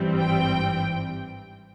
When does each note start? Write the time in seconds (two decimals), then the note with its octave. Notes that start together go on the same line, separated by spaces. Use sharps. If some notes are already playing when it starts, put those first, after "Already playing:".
Already playing: G#1 G2 E3 G3 C4
0.17 G5